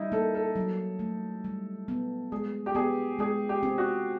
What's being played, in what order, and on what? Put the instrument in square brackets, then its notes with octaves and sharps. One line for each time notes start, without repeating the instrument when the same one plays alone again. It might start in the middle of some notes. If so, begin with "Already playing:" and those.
Already playing: [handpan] G3 [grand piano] D#4 E4
[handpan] A#3 [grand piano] A4
[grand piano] A4
[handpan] F#3
A3
G3
B3
[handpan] G#3 [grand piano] G#4
[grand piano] G4
[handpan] B3 [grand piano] G#4
[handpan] G#3 [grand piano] G#4
[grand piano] G4
[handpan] C4
[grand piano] F#4